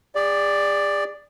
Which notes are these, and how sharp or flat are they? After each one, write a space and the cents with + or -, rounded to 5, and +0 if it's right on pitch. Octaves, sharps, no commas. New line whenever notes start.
G#4 -40 D5 +0